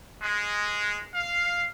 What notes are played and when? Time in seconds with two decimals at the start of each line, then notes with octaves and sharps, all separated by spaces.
0.22 G#3
1.15 F5